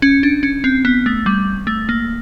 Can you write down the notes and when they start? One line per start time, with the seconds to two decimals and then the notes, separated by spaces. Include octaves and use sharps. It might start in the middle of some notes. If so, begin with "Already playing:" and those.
0.02 C#4
0.23 D4
0.43 C#4
0.64 C4
0.85 B3
1.06 A3
1.26 G3
1.67 A3
1.89 A#3